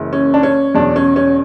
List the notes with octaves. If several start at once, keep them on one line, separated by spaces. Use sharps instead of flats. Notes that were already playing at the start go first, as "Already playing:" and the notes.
Already playing: F#1 F#2 E3 G#3
C#4
D4
C#4
E2 B2 F#3 D4
C#4
C#4